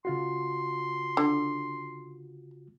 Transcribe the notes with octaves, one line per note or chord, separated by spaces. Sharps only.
C#3 F4 F#4 C6
D3